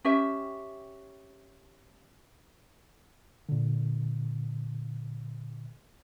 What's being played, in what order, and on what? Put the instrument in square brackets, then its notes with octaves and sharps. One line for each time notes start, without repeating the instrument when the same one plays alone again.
[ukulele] C#4 G4 E5
[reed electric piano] A#2 D3